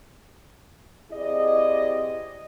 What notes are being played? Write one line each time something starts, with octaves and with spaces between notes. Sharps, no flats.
C3 E4 G#4 D5 D#5